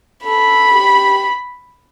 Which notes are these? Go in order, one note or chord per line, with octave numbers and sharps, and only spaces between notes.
A4 B5
G4